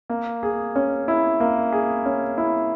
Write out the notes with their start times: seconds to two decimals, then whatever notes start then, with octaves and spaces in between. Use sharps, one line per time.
0.10 A#3
0.43 G#4
0.76 C#4
1.08 E4
1.40 A#3
1.73 G#4
2.06 C#4
2.38 E4